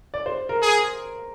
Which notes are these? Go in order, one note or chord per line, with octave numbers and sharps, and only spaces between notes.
D5
C5
A#4
G#4